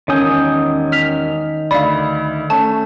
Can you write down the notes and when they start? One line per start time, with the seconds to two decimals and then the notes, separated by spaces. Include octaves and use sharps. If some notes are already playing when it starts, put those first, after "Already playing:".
0.08 E1 D#3 C#4 C#5 G#5 D#6 G6
0.92 F6 B6 F7
1.71 D2 D5 F5 B5
2.50 A3 C#4 A5